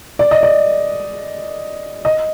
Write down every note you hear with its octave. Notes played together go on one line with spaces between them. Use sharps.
D5
D#5
D5
D#5